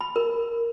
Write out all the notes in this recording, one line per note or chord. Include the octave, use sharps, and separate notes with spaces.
B5
A#4